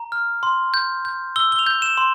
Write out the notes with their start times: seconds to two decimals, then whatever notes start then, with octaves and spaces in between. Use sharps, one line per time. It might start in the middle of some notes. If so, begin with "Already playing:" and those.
Already playing: A#5
0.12 F6
0.43 C6
0.74 G6
1.05 G6
1.36 E6 G7
1.52 G7
1.59 F7
1.67 G6
1.82 E7
1.97 C6